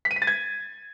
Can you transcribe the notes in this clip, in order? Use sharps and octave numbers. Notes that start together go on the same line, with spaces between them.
B6
D#7
B6
A6
G#6